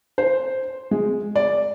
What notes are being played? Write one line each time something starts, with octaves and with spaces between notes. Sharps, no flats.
C5
G#3
D5